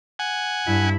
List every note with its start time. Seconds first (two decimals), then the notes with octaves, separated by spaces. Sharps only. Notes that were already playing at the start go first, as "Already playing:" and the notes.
0.19 F#5 G#5
0.67 G2 E4